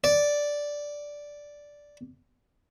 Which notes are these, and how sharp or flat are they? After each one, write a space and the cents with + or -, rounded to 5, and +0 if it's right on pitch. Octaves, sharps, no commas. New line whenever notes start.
D5 -5